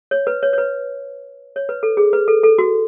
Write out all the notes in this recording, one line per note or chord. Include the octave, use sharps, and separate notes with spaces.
C#5
B4
C#5
C#5
B4
C#5
B4
A4
G#4
B4
A4
A4
F#4